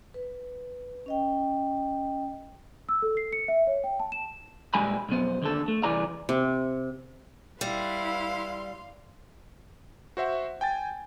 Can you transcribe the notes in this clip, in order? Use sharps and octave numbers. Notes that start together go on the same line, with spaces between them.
B4
C#4 D#5 G5
E6
A4
C7
C#7
E5
C#5
G5
A5
E7
A#2 G3 G#3 G#5 B5
B1 F2 B3 C5
D#2 D3 A4
A3
C2 E3 G#4 D5 A#5
C3
G3 E4 B4 F5 C6
F#4 C5 E5 F#5
G5 G#5 A6